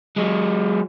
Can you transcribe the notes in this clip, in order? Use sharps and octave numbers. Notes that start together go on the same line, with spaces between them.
F#3 G#3